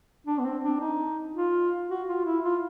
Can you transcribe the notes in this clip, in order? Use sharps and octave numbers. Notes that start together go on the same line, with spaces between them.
D4
B3
C4
D4
D#4
F4
F#4
F4
E4
F4